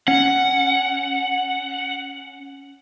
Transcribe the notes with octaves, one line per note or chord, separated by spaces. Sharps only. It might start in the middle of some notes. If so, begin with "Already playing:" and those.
C#4 F#5